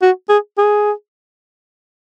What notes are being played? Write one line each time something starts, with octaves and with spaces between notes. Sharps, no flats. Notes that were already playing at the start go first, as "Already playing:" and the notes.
F#4
G#4
G#4